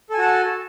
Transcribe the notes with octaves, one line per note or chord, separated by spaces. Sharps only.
F#4 A4 G#5 A5